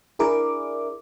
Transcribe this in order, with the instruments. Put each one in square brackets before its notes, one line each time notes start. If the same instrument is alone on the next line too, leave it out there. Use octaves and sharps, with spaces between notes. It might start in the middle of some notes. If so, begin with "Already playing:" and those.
[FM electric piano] D4 E4 G#4 A#4 D6